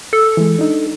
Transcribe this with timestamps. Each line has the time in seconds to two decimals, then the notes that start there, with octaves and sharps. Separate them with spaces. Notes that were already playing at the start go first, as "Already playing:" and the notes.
0.13 A4
0.37 E3 G#3
0.59 D4 D#4